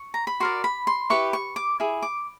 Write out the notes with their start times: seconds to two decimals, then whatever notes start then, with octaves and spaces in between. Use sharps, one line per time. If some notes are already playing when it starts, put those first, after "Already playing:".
Already playing: C#6
0.14 A#5
0.27 B5
0.40 F#4 A#4 D5 C6
0.64 B5
0.87 C6
1.10 E4 G4 B4 C#6
1.33 C#6
1.56 D6
1.80 E4 G#4
2.02 D6